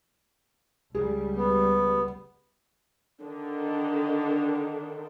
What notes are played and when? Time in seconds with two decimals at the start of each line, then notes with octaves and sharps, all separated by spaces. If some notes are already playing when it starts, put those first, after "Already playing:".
0.95 C#2 G3 G#4
1.36 B3
3.22 D3 D#3 D4